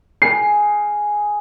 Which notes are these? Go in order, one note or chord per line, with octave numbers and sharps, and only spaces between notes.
G#4 C7